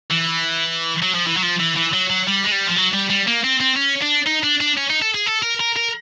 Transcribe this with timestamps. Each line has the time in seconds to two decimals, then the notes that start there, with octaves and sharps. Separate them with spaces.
0.10 E3
1.02 F#3
1.15 F3
1.27 E3
1.37 F#3
1.43 F3
1.60 E3
1.77 E3
1.94 F#3
2.10 F#3
2.27 G3
2.44 G#3
2.52 G3
2.68 F3
2.77 F#3
2.94 G3
3.10 G3
3.27 A#3
3.44 C4
3.60 C4
3.76 C#4
4.02 D4
4.27 D#4
4.44 D4
4.60 D4
4.77 C#4
4.90 D#4
5.02 A4
5.15 G#4
5.27 A4
5.43 A#4
5.60 A#4
5.77 A#4